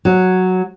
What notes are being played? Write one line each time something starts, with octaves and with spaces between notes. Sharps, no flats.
F#3